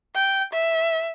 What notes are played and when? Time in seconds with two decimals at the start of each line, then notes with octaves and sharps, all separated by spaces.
0.15 G5
0.53 E5